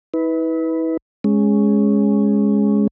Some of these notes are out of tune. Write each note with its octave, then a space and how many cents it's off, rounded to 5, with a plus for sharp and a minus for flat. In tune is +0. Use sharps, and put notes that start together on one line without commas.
E4 -40 B4 +0
G#3 +0 C#4 +0